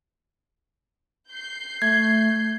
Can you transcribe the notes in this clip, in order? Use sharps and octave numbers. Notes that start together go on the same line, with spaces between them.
G6 C7
A3 G#6